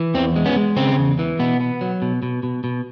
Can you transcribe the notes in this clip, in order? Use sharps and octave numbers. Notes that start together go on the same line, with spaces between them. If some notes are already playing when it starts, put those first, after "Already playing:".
Already playing: E3
E2 C4
G#3
B3 C#4
G#3
C#3 C4
E2
E3
B2 B3
B3
F#3
B2
B2
B2
B2